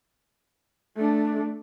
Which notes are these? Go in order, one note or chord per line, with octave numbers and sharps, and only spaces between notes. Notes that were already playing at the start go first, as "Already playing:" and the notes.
A3 D4